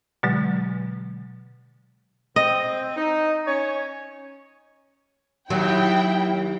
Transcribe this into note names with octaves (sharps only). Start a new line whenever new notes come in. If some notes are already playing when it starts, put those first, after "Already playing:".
B2 D3 F#3 G#3
C4 D#5
D#4
C#4 C#5
D#2 F#3 E4 G5